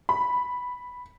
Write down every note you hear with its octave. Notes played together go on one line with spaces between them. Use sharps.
B5